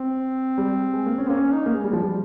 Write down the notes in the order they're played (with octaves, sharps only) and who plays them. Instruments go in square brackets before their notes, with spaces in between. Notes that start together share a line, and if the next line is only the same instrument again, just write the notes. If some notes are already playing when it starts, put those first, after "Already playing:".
Already playing: [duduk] C4
[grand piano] G3
G#3
A#3
C#4
[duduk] A#3 [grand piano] C#4
[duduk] C#4
D#4
[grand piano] A#3
G#3
G3
F3
G3